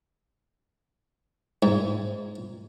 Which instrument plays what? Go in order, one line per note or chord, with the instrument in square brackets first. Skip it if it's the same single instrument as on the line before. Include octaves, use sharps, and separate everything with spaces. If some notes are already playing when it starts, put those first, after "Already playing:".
[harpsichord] G#2